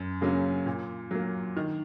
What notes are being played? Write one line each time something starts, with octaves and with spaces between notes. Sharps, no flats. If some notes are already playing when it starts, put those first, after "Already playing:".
Already playing: F#2
C#3 F#3 A#3 C#4
A#2
F#3 A#3
D#3